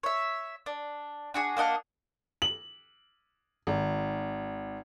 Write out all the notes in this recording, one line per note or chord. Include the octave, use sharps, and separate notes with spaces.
C#5 E5
D4
D4 F#4 G#4
A#3 D4 D#5 F#5
F#7
G#1